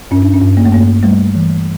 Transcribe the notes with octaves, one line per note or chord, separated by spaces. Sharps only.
G2 C#4
D4
C#4
G2
A#3
A3
G2 A#3
G3 A3
E3